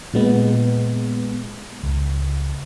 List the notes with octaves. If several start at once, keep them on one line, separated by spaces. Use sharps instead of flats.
A#2 G#3 B3
C#2